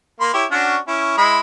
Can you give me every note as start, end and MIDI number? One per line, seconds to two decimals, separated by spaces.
0.21 0.33 58
0.21 0.33 83
0.21 0.33 84
0.34 0.45 64
0.34 0.45 67
0.34 0.45 73
0.51 0.76 61
0.51 0.76 62
0.51 0.76 66
0.88 1.16 61
0.88 1.16 64
1.18 1.40 56
1.18 1.40 64
1.18 1.40 83